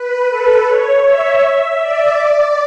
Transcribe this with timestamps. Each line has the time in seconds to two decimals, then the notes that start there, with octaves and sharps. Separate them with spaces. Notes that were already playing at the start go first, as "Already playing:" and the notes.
Already playing: B4
0.29 A4
0.67 C#5
1.05 E5
1.80 D5
2.18 D5